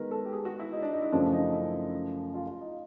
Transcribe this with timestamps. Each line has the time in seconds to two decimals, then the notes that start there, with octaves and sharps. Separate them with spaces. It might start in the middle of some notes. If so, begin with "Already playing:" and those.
Already playing: D#3 G#3 B3 A#4 B4
0.11 A4
0.25 G4
0.33 G#4
0.45 F#4
0.59 E4
0.73 D#4
0.82 D4
0.93 D#4
1.02 E4
1.12 F#2 C#3 F3 A3 C#4 D4
1.33 D#4
1.53 E4
2.34 F4
2.47 F4
2.61 D#4